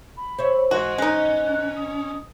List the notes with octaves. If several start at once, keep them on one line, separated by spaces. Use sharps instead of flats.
B5
C5 C#5 E5
G#2 E3 F#4 G#4 D#5 C6
G#3 C#4 D#4 F#6
D#6